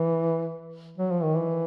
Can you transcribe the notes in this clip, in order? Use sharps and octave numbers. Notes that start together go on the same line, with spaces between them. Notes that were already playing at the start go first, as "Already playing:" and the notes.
Already playing: E3
F#3
F3
D#3
E3